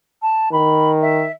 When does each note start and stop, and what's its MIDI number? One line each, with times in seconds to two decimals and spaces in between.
0.22 0.49 81
0.52 1.27 51
0.52 0.91 83
1.01 1.32 76